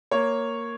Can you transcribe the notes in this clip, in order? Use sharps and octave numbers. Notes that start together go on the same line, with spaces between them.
A#3 C#5